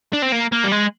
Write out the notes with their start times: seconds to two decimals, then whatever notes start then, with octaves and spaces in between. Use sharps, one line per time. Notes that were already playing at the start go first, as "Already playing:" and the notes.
0.13 D4
0.22 C4
0.32 A#3
0.52 A#3
0.64 G3
0.72 G#3